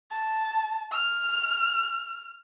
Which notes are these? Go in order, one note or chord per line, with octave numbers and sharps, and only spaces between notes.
A5
F6